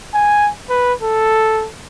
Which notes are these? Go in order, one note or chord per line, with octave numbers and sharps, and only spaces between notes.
G#5
B4
A4